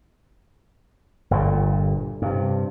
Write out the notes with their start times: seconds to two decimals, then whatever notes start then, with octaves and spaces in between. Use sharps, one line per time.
1.31 G1 G2 A#2
2.22 G2 C3